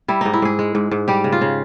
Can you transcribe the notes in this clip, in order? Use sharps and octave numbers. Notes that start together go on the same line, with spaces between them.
G3 E4
G#2 D#4
E4
G#2 G#4
G#3
G#2
G#2
G3 G4
C#3
F4
C#3